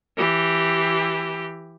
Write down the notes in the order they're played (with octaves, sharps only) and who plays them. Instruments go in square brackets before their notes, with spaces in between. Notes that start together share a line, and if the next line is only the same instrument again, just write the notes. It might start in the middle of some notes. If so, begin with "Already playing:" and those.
[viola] E3 G4